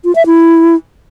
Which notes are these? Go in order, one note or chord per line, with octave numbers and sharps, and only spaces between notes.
F4
E5
E4